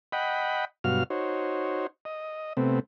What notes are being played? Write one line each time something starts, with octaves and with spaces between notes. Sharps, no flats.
D#5 F#5 G5 B5
G2 B2 F#3 F#4 F5 F6
D#4 F#4 C5 C#5
D#5
C3 A3 B3 C4